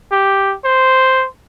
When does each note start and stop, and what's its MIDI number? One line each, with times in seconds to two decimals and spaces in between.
0.12 0.56 67
0.65 1.26 72